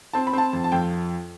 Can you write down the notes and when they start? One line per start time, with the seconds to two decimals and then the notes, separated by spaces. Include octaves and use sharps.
0.13 C4 A5
0.27 B5
0.33 C4 A5
0.53 F2
0.64 A5
0.72 F2 G5